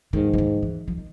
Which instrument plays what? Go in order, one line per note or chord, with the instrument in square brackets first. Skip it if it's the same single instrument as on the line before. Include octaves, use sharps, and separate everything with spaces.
[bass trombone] G#2 [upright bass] D#3
[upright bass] E3
D#3
E3
F3
D#3